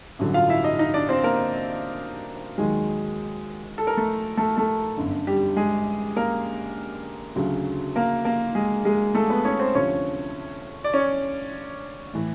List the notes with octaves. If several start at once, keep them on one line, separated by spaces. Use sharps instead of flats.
A1 G2 D3 F#3
F4 F5
E4 E5
D#4 D#5
D#4 D#5
D4 D5
C4 C5
A#3 A#4
D#2 D#3 F#3 G#3 G#4
A4
A#4
A3 A4
A3 A4
A3 A4
G1 F#2 D3
G3 G4
G#3 G#4
A#3 A#4
D2 C#3 F#3
A#3 A#4
A#3 A#4
G#3 G#4
G#3 G#4
A3 A4
B3 B4
C#4 C#5
C4 C5
D2 C3 F3 C#4 C#5
D5
C#4 C#5
A2 E3